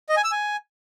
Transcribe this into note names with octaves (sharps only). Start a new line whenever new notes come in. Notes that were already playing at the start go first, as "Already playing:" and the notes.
D#5
G#5
E6
G#5